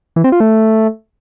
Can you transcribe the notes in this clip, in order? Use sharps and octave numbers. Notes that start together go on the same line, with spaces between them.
E3
C4
F4
A3